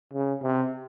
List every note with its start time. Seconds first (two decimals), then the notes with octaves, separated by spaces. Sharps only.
0.13 C#3
0.42 C3